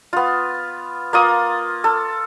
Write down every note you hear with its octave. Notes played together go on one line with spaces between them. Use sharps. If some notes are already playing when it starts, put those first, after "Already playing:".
B3 F4
A#3 F4 D#6
A4